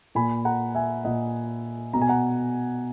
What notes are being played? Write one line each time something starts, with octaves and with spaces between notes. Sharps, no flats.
A#2 G#5 B5
F#5 A#5
E5 G#5
A#2 D#5 F#5
B2 A#5
G#5
F#5 A#5